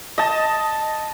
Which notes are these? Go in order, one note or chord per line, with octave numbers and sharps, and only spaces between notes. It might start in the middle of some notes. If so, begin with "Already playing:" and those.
D#5 A5